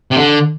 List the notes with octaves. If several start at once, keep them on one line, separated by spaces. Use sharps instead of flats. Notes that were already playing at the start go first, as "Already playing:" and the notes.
C3
D3